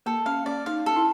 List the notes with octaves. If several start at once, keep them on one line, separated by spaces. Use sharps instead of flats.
A#3 A4
C#4 F5
C#4 D5
D#4 F5
A4
E4